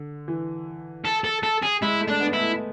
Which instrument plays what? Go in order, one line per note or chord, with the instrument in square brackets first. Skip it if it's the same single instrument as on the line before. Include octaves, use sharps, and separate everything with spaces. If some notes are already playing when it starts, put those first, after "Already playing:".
Already playing: [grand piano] D3
E3
[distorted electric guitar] A4
A4
A4
G#4
[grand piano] G#3 [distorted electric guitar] E4
[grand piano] A3
[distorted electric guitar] D4
[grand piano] B3
[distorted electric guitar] E4
[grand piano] A3